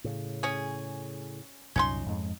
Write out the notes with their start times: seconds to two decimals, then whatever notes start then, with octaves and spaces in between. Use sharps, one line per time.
0.04 A2 C#3
0.43 C#4 G#4
1.76 C2 F#2 A#2 C#4 D#4 C6
2.06 F2 G#2 G#3